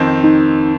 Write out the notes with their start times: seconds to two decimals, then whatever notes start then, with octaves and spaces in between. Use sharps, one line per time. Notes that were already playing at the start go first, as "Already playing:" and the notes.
Already playing: F2 D#3 C4
0.24 D#4